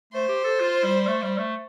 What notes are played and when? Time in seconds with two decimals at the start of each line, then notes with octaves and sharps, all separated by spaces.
0.12 A3 C5
0.29 G4
0.44 A4
0.60 F4
0.83 G3
1.07 A3
1.22 G3
1.38 A3